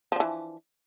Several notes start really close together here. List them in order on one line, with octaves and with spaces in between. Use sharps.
F3 D4 E3